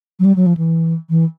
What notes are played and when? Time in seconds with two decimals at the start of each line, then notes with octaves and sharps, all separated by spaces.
0.19 F#3
0.25 G3
0.36 F#3
0.46 F3
0.57 E3
1.10 E3